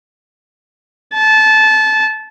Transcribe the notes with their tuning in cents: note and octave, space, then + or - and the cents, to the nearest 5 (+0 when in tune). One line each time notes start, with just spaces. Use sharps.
A5 -20